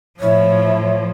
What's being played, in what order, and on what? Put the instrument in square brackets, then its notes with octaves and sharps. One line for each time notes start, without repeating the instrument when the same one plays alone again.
[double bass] A2 E4 [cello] F3 [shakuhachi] C#5